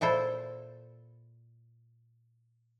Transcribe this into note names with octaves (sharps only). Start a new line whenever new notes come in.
A#2 E4 A4 C5